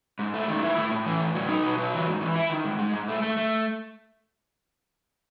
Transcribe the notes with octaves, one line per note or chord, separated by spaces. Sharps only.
G#2
A3
D#3
E4
A2
A2
E3
A2
F#3
D#4
B2
F#3
E3
G#2
E3
E4
D#3
G#2
G#3
G#2
A3
A3
A3